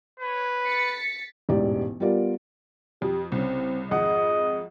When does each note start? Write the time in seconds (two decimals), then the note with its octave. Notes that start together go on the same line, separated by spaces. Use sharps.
0.20 B4 C#5
0.65 A6 B6 C#7
1.49 E1 A1 G#2 D#4 G4 D5
2.00 G3 B3 F4 A#4 D5
3.02 F2 G4
3.32 C2 C#3 C4
3.91 G#1 F2 G#4 D#5 F#5